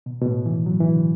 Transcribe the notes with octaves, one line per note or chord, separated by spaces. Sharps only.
B2
B2
A2
E3
F#3
E3
D3